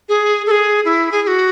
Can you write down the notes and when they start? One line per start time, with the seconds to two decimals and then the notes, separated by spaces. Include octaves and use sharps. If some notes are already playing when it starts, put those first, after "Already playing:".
0.09 G#4
0.46 A4
0.51 G#4
0.85 E4
1.12 G#4
1.23 G#4
1.27 F#4